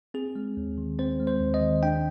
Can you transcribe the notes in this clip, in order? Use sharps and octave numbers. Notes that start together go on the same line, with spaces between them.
C4 G#4
G#3
D#2
D#3
C4 C5
G#3
C5
D#2
D#5
D#3
D4 G5